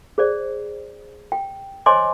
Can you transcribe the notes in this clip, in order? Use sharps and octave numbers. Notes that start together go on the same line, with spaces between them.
G#4 C5 D5
G5
C5 C#5 D#5 G#5 C6 D6